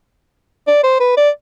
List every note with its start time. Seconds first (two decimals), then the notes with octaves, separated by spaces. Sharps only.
0.67 D5
0.84 C5
1.00 B4
1.17 D5